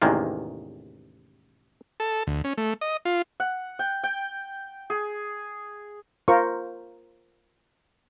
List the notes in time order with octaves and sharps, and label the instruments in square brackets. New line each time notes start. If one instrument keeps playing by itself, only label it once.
[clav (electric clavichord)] A1 E2 C3 D#3 G#3 A#3
[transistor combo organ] A4
D2
C#4
A3
D#5
F4
[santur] F#5
G5
G5
G#4
[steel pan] F4 A#4 C5 C#6